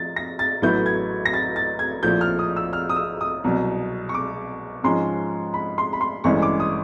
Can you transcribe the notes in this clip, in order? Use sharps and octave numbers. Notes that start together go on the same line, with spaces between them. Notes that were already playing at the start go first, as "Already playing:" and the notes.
Already playing: F3 A6
A#6
A6
A1 A2 F#3 B3 E4 G6
G#6
A#6
A6
A6
G#6
A#1 A2 F3 G6
F6
D#6
E6
F6
D#6
E6
D#6
C2 B2 F#3
C#6
D6
G#2 F3 G#3 C#4 C6
B5
C6
B5
C6
A1 G2 E3 G#3 C#4 C#6
D6
D#6